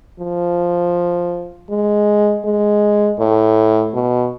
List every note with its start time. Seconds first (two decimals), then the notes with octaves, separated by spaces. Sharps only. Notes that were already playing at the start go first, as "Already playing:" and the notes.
0.20 F3
1.70 G#3
2.44 G#3
3.19 A2
3.94 B2